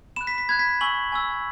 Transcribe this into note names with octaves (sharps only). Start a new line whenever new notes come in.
B5 F#6 E7
B6
B6
B5 F#6 G#6
B6
G#5 C#6 E6 F#7
G#5 C#6 E6